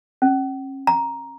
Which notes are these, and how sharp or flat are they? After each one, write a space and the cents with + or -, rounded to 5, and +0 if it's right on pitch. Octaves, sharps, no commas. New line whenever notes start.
C#4 -40
A#5 +5